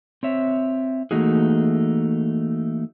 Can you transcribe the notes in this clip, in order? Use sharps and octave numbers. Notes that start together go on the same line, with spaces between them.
C4 C#5 E5
E3 A3 A#3 D#4 F#4 G#4